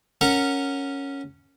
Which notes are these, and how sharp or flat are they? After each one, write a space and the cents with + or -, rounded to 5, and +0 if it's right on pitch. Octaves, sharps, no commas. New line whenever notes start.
C#4 +0 A#4 -10 F#5 -10